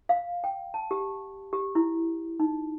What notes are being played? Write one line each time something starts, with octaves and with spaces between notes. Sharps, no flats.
F5
G5
A5
G4
G4
E4
D#4